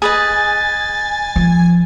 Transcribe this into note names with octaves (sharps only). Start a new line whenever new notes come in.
G#4 B4 D#5 G#5 A6
F3